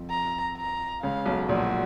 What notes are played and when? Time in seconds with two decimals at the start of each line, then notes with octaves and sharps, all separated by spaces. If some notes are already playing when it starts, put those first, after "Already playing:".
Already playing: F2 F3
0.10 A#5
0.57 A#5
1.02 C#2 C#3 F5
1.26 B1 B2
1.49 A#1 A#2 F#4